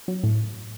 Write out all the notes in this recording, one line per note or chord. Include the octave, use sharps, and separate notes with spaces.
F#3
A2